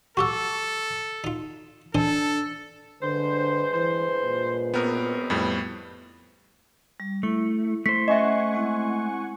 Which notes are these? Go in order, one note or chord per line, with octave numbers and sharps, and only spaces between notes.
F#4 G4 A4 F#5 C#6 D6 E6
D#4 F4
D4 A4 C5 D#5 G#5
G2 D3 G#3 B4 C5
E3 C5
A#2
F#2 B2 B3 C4 A#4
F2 A2 G3 B3
G3
A3 E4
A3 E4 C5 B6
C#4 D#5 E5 F#5 G#5 C#6
G#3 C4 E4